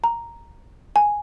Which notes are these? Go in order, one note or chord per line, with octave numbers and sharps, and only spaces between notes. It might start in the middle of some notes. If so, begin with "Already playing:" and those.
A#5
G#5